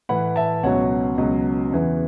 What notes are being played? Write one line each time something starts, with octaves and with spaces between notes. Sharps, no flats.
A2 E3 F#5 B5
E5 A5
C#2 B2 F#3 C#5 F#5
C#2 B2 F#3
E2 C#3 E3